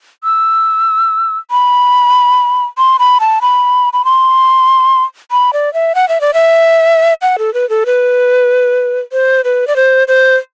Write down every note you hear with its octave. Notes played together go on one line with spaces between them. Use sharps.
E6
B5
C6
B5
A5
B5
B5
C6
B5
D5
E5
F#5
E5
D5
E5
F#5
A4
B4
A4
B4
C5
B4
D5
C5
C5